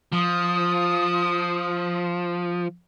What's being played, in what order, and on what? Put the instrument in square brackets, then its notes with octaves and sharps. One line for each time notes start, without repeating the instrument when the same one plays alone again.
[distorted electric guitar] F3 [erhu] D#6